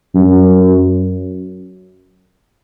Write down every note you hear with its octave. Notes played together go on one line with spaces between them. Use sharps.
F#2